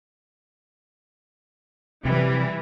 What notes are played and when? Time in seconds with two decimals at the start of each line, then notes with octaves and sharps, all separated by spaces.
2.05 C3 E3 G3